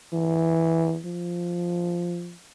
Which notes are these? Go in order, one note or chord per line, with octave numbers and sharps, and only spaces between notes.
E3
F3